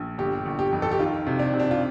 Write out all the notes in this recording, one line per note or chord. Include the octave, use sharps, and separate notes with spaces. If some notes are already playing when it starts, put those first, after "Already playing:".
Already playing: A#1
G1 G4
G1
G4
F2
A4
G4
D#3 F4
C3
D4
C3
D4
F4